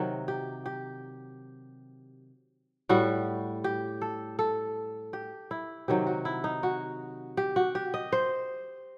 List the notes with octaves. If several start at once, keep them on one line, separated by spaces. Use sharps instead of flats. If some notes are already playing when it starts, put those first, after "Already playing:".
Already playing: C3 D#3 F#3 F#4
G4
G4
A2 G3 F#4
G4
A4
A4
G4
E4
C3 D#3 F#3 G4
F#4
E4
D#4
F#4
G4
F#4
G4
D#5
C5